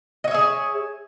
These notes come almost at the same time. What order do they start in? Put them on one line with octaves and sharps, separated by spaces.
D#5 C#5 E5 G#4